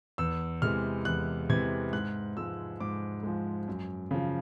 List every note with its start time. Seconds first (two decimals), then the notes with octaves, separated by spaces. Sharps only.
0.18 E2 E6
0.62 C3 E3 G#3 F6
1.05 E2 F#6
1.49 C3 E3 G#3 G#6
1.92 G#2 F#6
2.37 F3 G#3 E6
2.80 G#2 D6
3.23 F3 G#3
3.68 F#2
4.11 C#3 F3